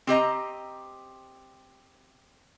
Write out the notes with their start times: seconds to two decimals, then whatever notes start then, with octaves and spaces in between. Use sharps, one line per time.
0.07 C4 G4 D#5 A#5